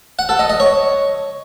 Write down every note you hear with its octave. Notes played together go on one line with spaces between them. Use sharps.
F#5
A4
D#5
D#5
C#5